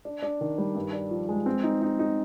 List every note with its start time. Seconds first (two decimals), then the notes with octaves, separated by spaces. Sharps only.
0.05 D4
0.22 D4
0.41 D#3
0.58 G3
0.75 G2
0.93 D4
1.11 F3
1.29 G#3
1.46 C4
1.63 D#4
1.82 D#4
1.99 D#4